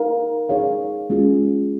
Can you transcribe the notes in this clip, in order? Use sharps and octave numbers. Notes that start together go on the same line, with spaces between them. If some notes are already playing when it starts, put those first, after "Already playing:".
Already playing: D#4 A#4 F5
D#4 G#4 C#5 F5
G#3 C#4 F4 G#4